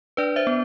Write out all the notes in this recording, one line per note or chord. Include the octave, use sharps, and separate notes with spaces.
D4 B4 D5
C5 E5
B3